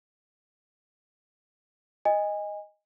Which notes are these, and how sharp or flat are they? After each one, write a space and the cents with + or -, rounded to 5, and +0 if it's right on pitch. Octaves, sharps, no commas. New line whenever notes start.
D#5 +0 G#5 -25